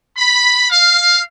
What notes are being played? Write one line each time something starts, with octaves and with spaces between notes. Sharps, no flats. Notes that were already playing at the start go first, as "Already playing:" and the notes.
B5
F5